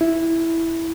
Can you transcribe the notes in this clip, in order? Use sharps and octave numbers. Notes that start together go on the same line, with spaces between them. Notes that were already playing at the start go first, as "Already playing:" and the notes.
E4